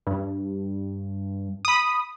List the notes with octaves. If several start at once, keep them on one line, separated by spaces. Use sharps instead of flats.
G2
B5 D#6